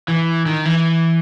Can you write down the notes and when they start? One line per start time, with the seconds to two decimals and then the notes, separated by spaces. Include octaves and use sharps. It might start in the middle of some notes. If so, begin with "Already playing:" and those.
0.08 E3
0.46 D#3
0.65 E3